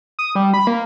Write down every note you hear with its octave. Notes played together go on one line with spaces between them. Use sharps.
D#6
G3
B5
A#3